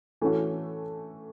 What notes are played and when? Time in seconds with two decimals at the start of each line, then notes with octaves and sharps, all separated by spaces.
0.21 E3 A3 C#4 F#4